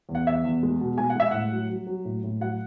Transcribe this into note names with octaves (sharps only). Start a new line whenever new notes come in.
E2
F#5
E2 E5
E2
G#3
B2
G#3 G#5
F#5
G#3 E5
A2 F#5
F#3
F#3
F#3
A2
A2
F#3 F#5